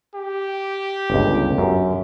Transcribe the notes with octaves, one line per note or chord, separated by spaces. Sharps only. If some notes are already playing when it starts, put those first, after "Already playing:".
G4
G1 C#2
F#2